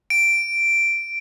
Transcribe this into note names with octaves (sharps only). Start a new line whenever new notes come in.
D7